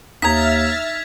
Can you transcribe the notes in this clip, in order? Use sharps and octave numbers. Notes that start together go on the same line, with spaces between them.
D#2 D#4 E5 A#5 F6 G#6 A6 B6